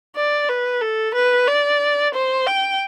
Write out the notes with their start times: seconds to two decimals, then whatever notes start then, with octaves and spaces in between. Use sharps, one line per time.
0.16 D5
0.48 B4
0.81 A4
1.14 B4
1.47 D5
2.14 C5
2.47 G5